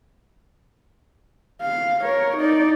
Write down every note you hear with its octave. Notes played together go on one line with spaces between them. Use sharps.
F5
A#4 C#5
D#4 D5